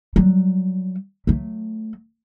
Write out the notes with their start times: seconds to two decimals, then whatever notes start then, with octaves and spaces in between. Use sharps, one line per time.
0.16 F#3 G3
1.27 F#3 A3